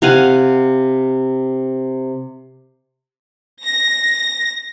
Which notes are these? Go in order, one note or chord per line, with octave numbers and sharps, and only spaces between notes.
C3 F5 F#5 G#5
A#6